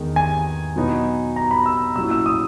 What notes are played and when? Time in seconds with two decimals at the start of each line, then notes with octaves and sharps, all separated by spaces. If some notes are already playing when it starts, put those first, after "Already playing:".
Already playing: E2 D#3 G#3
0.16 G#5
0.76 B2 F#3 B3 D#4
1.36 A#5
1.51 B5
1.66 E6
1.96 A#2 F#3 C#4 E4 E6
2.11 E6
2.26 D#6